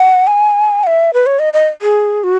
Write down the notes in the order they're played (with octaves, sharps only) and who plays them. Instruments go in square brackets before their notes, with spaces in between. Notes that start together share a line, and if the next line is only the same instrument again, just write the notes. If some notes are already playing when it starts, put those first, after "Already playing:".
Already playing: [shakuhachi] F#5
G#5
F#5
E5
B4
C#5
D#5
D#5
G#4
F#4